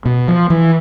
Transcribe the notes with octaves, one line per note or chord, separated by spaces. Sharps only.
B2
F3
E3